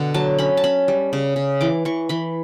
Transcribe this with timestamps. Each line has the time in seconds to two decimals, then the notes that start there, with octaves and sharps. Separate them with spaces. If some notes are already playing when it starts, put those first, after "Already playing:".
Already playing: B2 D3 F#5
0.14 F#3 A5
0.38 C#4 B5
0.57 A5
0.64 C#4 B5
0.88 G3
1.13 C#3
1.36 C#3
1.61 E3 D6
1.85 E3 C#6
2.09 E3 B5